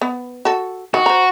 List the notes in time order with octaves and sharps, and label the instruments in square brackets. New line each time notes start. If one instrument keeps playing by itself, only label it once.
[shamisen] B3
F#4 A4
[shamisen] D#3 [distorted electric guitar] F#4
[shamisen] C5 A#5